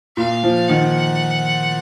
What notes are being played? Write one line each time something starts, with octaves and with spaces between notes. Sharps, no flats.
A#2 F5
F3
D#3 F#5